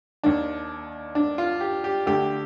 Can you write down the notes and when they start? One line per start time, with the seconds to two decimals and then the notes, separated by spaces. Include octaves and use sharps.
0.23 D#2 D#3 D4
1.15 D4
1.38 F4
1.61 G4
1.84 G4
2.06 D2 D3 G4